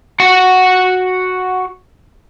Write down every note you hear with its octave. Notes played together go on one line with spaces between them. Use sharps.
F#4 F#5